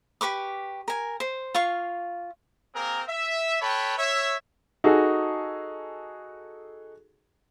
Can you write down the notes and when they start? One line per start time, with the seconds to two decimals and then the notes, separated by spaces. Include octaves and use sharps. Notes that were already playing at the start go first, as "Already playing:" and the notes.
0.21 G4 B4 C#6 D6
0.88 A#4 G#5
1.20 C5
1.54 F4 F5 C#6
2.74 A#3 C4 G#4 A#4
3.08 E5
3.61 A4 B4 C#5 G5 B5
3.98 C#5 E5
4.84 D#4 F#4 G#4 A4